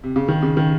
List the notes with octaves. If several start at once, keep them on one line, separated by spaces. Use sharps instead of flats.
C3
C#3
D#3
C#3
D#3